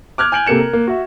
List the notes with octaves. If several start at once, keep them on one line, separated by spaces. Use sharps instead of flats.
D6 F6 F#6 G#6
G#5 G6 D7 F#7
C3 A#3 A4 C#7 E7
A#4
A#3
F#4 E5